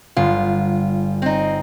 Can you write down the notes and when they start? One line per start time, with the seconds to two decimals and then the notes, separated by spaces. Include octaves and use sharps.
0.17 G1 F4
1.22 C4 D#4